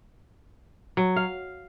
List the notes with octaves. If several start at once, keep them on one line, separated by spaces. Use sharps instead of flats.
F#3
F5